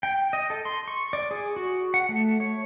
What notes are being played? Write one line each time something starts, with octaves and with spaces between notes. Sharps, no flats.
G5
D#5
A4
C6
C#6
D5
G#4
F#4
F#5
A3
C#5